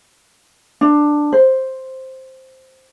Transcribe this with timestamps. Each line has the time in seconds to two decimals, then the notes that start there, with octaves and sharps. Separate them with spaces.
0.81 D4
1.32 C5